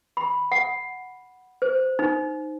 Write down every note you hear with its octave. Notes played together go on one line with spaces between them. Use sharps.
B5
F#5
C5
D#4